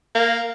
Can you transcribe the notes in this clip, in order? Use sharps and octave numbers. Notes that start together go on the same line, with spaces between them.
A#3